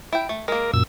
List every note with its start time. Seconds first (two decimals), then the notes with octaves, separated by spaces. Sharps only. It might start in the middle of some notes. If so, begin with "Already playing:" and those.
0.13 E4 G5
0.29 A3
0.48 G#3 A#3 A#4
0.74 F#2 A#2 E6